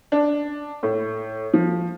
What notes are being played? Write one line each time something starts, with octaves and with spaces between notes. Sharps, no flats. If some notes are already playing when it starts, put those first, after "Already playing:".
D4
A2
F3